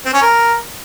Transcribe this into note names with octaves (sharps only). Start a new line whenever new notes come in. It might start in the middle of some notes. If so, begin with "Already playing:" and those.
C4
C#4
A#4